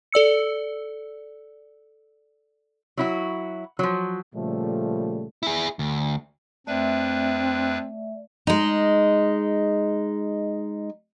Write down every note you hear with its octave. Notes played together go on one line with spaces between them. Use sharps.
A4 D5 E6 C#7
F#3 E4 F#4
F3 F#3
A#2 C#3 F3 G3 A3
E4 G#4
D2
F2 A3 C4 D4 B4 D5 E5
G#3 D#4